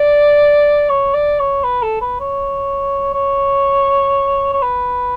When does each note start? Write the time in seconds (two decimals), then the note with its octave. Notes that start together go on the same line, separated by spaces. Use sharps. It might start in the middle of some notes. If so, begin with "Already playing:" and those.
Already playing: D5
0.89 C#5
1.14 D5
1.39 C#5
1.64 B4
1.83 A4
2.01 B4
2.20 C#5
3.14 C#5
4.53 C#5
4.62 B4